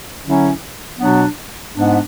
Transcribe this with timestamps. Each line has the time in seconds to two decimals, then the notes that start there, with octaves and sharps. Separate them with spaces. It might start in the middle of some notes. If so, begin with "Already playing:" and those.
0.24 D3 F#3 C#4 E4
0.98 B2 F#3 B3 D4
1.73 G#2 G#3 B3 D4